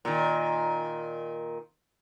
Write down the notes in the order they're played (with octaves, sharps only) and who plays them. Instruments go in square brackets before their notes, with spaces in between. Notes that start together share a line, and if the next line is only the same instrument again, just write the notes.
[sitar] A#2 D#3